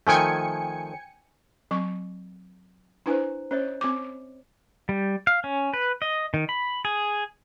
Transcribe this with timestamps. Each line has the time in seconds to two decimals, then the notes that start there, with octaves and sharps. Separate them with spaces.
0.07 D#3 F3 A3 G5 G#5 C#7
1.71 F#3 C4 C#6
3.06 D4 E4 B4 C5 G#5 A#5
3.51 C#4 C5 C#5 D#5
3.81 C4 D6
4.89 G3
5.27 F5
5.44 C#4
5.74 B4
6.02 D#5
6.34 D#3
6.49 B5
6.85 G#4